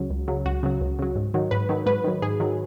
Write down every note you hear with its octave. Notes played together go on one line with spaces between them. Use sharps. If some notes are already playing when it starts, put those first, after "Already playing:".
Already playing: C#2 C#3 F#3
C#2
C#3 F#3
C#2 F#4
C#3 F#3
C#2
C#3 F#3
G#2
D#3 F#3
G#2 B4
D#3 F#3
G#2 B4
D#3 F#3
G#2 G#4
D#3 F#3